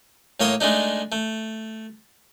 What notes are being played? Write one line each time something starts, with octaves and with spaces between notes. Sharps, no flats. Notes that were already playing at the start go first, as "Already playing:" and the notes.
A2 A#3 C#5 C6 D#6
G#3 A3 D4 D#4
A3